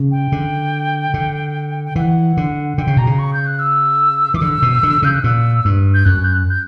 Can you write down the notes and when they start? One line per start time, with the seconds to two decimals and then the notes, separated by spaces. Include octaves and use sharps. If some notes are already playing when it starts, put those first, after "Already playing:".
Already playing: C#3
0.11 G5
0.32 D3
1.14 D3
1.85 G5
1.96 E3 F#5
2.37 D3
2.78 D3 G5
2.87 C#3
2.97 B2 A#5
3.07 C#3
3.19 C#6
3.33 G6
3.47 F#6
3.59 E6
4.34 E3 D6
4.41 D3 E6
4.62 B2
4.83 D3
5.02 C#3 G6
5.14 F#6
5.23 A#2 E6
5.65 G2
5.94 G6
6.05 F#2 F#6
6.24 G6
6.33 F#6
6.50 G6